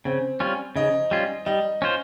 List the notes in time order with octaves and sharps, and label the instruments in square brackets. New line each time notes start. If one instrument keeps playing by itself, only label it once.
[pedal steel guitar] C#3 [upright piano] C4
[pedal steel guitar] G3 C#4 F4
[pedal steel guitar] C#3 [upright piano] D#4
[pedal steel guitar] G3 C#4 F4
[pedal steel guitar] G3 [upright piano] D#4
[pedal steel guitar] C#4 F4 C5